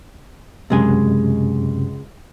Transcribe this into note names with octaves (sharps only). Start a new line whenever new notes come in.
C#2 F#2 C3 G#3 G#5